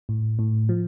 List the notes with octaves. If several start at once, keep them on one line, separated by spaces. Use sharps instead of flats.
A2
A2
F3